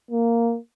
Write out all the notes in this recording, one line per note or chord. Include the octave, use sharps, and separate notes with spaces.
A#3